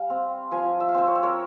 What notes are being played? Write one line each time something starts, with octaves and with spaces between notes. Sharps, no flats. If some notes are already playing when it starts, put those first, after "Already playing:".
Already playing: G3 F5 G#5
C4
F3 F5 G#5
E5
F5
C4 C5 E5
C#5
E5
A#4 C#5